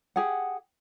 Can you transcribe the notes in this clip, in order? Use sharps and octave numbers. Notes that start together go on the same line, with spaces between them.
G4 G#4 F#5